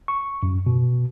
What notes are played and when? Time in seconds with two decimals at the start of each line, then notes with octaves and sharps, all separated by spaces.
0.08 C#6
0.43 F#2
0.66 B2